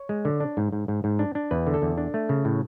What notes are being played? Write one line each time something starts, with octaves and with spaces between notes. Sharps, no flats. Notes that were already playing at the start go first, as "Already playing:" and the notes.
Already playing: C#5
G#3
D3
D4
G#2
G#2
G#2
G#2
D4
D4
E2 B4
D3
A4
E2
D4
A3
C#3
A2